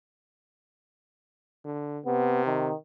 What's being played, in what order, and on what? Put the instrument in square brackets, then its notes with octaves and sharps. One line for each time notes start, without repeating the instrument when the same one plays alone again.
[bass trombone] D3
[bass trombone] C3 [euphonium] B3
[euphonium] D#3